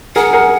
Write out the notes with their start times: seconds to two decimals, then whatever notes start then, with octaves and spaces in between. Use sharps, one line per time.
0.16 G#4 A#4 F#5
0.33 G#4 A#4